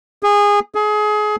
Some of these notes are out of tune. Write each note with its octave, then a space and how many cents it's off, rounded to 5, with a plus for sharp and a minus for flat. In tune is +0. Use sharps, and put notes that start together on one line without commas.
G#4 -20
G#4 +25